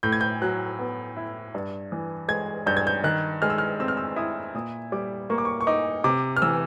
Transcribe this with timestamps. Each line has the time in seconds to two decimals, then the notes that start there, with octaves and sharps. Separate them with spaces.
0.03 A2 G6
0.12 G#6
0.21 G6
0.42 F#3 F#6
0.79 B3
1.17 E4
1.54 G2
1.92 E3
2.28 G#3 G#6
2.66 G2 G6
2.77 G#6
2.87 G6
3.04 D#3 F#6
3.42 G#3 F6
3.50 E6
3.58 F6
3.80 C4 E6
3.88 F6
3.97 E6
4.16 E4 D#6
4.54 A#2 D#6
4.92 G3 D6
5.30 A#3 C#6
5.38 D6
5.45 C#6
5.61 C#6
5.67 D#4 D6
6.04 C3 D6
6.37 F6
6.42 E3 E6